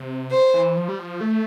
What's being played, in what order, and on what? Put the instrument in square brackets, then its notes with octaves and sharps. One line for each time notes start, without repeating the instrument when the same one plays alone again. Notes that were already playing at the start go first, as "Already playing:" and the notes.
Already playing: [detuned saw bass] C3
[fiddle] C5
[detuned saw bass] E3
F3
G3
F3
A3